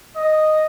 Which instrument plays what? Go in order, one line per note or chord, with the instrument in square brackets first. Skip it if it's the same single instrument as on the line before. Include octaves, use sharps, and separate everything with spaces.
[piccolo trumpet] D#5